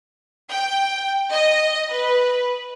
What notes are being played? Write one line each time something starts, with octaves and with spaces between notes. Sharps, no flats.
G5
D#5
B4